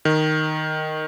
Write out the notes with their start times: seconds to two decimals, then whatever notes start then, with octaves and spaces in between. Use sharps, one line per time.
0.05 D#3